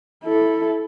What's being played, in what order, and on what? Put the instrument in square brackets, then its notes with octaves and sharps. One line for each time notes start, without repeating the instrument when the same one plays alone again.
[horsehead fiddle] E4 A4